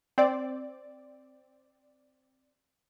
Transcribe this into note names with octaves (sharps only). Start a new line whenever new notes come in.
C4 D5